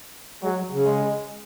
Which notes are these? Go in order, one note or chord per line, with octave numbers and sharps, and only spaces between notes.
F#3 G#3
F#3
C#3
G#3